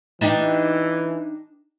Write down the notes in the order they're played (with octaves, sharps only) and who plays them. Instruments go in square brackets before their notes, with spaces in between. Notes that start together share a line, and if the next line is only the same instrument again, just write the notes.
[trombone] E3 [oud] D4 D#4 G4